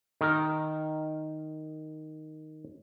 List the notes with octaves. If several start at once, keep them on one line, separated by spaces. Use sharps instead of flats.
D#3 A#4